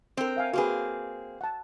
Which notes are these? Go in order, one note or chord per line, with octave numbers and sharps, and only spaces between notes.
C4 A#4 G5
E5 F5 G#5
A#3 C4 F#4 G#4 B4
F#5 A5